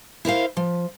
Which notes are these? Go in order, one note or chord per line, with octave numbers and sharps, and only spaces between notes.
E4 A#4 C5 F5
F3